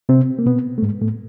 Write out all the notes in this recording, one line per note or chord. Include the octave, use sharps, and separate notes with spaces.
C3 C4
A#3
B2 B3
A3
G#2 G#3
A2 A3